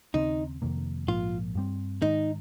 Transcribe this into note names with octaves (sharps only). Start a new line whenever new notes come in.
D#2 C#3 G3 C4 D#4
F2 C3 D#3 A#3
A#1 G#2 F3 A#3 F4
G2 G3 C4
G#2 D#3 G#3 D#4